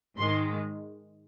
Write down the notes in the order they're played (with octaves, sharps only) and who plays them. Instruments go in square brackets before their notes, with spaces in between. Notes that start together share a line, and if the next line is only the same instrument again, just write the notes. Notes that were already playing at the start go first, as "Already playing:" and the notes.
[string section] G#2 D#3 G#3 C6